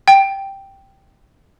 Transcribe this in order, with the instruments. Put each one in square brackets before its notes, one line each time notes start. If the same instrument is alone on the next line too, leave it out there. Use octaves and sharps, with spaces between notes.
[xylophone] G5